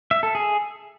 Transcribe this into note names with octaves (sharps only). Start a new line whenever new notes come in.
E5
A4
G#4